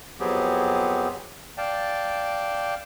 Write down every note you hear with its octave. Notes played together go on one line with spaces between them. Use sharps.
F2 F#3 B3 C4 G4 G#4
D5 F5 G5 A5